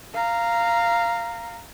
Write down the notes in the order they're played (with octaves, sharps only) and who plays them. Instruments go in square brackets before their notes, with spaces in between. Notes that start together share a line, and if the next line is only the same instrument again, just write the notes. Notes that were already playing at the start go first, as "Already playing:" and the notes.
[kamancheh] F5 A#5